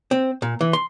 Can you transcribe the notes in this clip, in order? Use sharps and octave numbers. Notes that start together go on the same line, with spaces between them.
C4
A#2
E3
C6